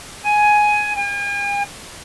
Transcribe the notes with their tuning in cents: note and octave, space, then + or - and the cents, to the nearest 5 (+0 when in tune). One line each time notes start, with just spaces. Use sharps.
G#5 +10
G#5 -45